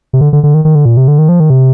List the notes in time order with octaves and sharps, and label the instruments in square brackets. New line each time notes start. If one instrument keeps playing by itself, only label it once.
[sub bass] C3
D3
D3
D3
D#3
D#3
D3
A#2
C3
D3
D#3
F3
D#3
C3